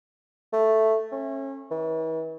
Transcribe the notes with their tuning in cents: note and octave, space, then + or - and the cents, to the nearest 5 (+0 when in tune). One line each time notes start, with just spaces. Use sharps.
A3 +0
C#4 -30
E3 -40